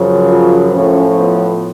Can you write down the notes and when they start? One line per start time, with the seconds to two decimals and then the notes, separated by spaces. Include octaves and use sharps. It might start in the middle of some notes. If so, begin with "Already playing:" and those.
Already playing: F#2 C#3 F3
0.28 F4
0.72 A2 F3 C#4
1.16 B3